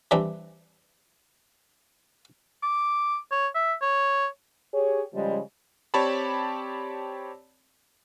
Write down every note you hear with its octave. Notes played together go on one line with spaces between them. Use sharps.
E3 G3 C4 D4
D6
C#5
E5
C#5
G4 G#4 C#5
C#3 F3 G3 G#3
C4 G4 C#5 D5 A5 B5